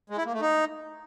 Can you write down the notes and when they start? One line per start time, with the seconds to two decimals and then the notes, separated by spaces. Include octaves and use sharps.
0.10 G#3
0.18 E4
0.25 A#3
0.33 A3
0.41 D#4